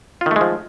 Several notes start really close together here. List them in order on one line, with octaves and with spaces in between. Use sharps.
F4 D#3 A3 G#3 F3